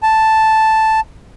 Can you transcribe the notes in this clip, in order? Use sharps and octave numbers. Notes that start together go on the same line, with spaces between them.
A5